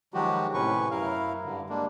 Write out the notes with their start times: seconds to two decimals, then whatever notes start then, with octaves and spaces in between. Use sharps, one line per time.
0.14 D#3 F3 F#3 G#3 F#4 G4
0.54 A2 C3 C#4 B4 C#6
0.91 F#2 E4 A#4 F5
1.44 G2 D3
1.69 G3 G#3 A#3 D4